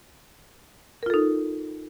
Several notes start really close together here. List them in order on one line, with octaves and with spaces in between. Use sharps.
A#4 F4 A4 D#4